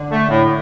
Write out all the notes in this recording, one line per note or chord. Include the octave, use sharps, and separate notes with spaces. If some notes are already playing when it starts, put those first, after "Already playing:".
Already playing: D3
A3
A2